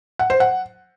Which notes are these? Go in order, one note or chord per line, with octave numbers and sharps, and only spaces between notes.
F#5
C5
F#5